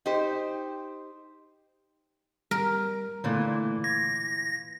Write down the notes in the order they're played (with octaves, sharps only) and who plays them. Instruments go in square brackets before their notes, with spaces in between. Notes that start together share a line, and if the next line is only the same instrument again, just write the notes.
[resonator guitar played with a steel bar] D#4 G4 C5
[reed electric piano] G3 [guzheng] A#4
[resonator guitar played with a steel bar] A#2 E3 [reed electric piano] D3 A3 E4
[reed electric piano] G#6 [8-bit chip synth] A#6